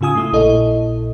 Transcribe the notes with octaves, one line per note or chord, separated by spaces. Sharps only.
A2 C#3 F4 G#5 D#6
A3 E4 D#6
A#1 A#2 E4 A4 D#5